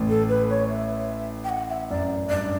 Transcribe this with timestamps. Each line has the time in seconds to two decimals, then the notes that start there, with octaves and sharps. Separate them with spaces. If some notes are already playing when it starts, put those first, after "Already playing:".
Already playing: A1 A2
0.09 A4
0.29 B4
0.50 C#5
0.69 E5
1.44 G5
1.49 F#5
1.70 E5
1.90 F#2 D5
2.30 G2 D5